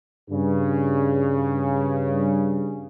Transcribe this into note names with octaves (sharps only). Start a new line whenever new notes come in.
G2 C#3